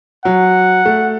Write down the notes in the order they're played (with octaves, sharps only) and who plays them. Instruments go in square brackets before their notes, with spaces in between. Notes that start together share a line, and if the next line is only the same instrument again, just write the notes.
[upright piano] F#3 [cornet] F#5
[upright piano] A3